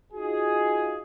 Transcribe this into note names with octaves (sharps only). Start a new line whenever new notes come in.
D#4 F4 F#4 G#4